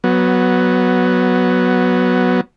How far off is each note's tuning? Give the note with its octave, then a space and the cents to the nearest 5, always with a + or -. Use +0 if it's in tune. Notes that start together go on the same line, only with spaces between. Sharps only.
F#3 -5 B3 +0